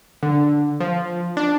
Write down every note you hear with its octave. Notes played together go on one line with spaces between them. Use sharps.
D3
F3
D4